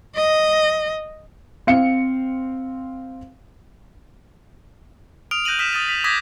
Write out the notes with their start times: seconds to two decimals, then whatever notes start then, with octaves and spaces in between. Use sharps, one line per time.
0.16 D#5
1.67 C4 F5 C#7
5.31 D#6 F6 D7 F7
5.45 F#6 G6 A#6 D7 D#7 F#7
5.59 D#6 F6 B6 D7 E7
5.73 D#6 A6 D#7
5.89 B6
6.04 D6 D#6 G6 G#6 A#6 B6